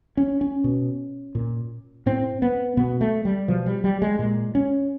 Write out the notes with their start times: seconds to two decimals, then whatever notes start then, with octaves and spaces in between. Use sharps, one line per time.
0.17 C#4
0.41 C#4
0.64 B2
1.35 A#2
2.06 A2 C4
2.42 B3
2.77 B2 B3
3.01 A3
3.25 G3
3.48 B2 F3
3.66 G3
3.84 G3
4.02 G#3
4.19 A#2 G#3
4.55 C#4